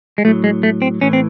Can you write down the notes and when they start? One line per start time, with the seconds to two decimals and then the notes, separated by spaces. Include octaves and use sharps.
0.18 G#3
0.25 A2 F#3 A3
0.44 G#3
0.63 A3
0.82 C4
1.01 A2 E3 C#4
1.13 C4